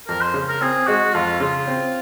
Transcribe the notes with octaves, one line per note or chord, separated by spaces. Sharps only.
F2 A#4
C5
C#3
A#4
C4 G#4
G#3 F#4
F2 F4
C#3 F4
C4